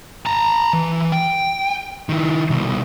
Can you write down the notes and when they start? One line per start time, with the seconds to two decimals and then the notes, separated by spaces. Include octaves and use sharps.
0.26 A5 A#5
0.73 E3
1.12 G5
2.09 D#3 E4
2.50 C2 B2